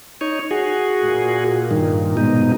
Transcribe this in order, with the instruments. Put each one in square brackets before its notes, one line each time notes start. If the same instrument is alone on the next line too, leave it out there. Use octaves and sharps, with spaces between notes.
[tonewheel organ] D#4 C#5
F#4 G#4
[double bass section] A#2
[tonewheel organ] G2 D#3
G#2 B2 D#4